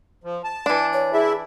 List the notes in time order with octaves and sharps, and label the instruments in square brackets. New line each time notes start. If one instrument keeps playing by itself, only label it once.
[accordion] F3
A5
[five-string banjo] E3 D4
[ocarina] C#5
[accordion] E4 E5 [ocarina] G#4